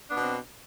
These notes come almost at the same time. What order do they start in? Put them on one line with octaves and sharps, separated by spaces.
D4 B3 B2 C4